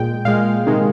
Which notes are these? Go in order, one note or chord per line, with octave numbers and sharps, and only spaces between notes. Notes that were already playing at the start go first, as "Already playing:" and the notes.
Already playing: A#2 G#3 G5
A#2 G#3 F5
C3 D#3 G#3